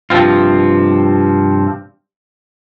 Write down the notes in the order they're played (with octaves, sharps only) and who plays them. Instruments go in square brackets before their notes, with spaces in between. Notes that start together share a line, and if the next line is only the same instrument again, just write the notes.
[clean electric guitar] G2 C3 F3 C4 F4